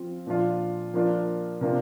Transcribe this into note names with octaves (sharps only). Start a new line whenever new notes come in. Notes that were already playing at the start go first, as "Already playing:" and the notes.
Already playing: F3 C4 F4
A#2 F3 D4 F4
F3 A#3 D4 F4
C3 A#3 D4 F4